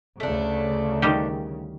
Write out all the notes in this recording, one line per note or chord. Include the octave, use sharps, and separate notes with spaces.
D2 C#3 A3 D4
D#3 G3 G4